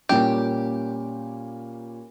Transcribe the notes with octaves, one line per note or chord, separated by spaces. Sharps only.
A#2 G3 A#3 C#4 G4